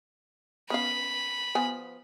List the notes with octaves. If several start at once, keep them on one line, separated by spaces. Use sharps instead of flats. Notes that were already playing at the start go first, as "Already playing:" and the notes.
B3 C#4 F5 B5
F3 B3 G#5